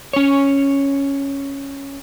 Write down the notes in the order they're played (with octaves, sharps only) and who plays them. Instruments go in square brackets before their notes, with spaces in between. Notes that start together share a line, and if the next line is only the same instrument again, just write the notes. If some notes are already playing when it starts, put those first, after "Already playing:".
[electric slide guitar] C#4 C#5